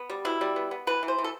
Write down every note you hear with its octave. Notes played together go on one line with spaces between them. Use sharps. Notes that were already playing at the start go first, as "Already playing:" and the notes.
Already playing: B3
G3
B2 E4
G3
B3
B3
E3 B4
E3
C5
E3
A4